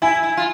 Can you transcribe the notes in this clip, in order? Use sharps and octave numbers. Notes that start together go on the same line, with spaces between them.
E4 G#5
E4
F4